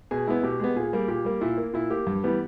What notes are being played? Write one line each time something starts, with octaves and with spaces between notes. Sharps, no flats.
B2 G#4
G#3 B3 E4
B2 G4
G#3 B3
A#2 G#4
G3 A#3
A#2 G4
G3 A#3
A#2 E4
A#3
A#2 E4
A#3 G4
G2
E3 G3 B3